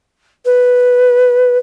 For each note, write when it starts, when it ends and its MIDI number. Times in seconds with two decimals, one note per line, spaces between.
0.45 1.57 71